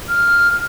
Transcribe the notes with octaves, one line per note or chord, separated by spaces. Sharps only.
F6